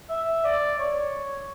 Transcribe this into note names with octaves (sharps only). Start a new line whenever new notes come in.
E5
D5
C#5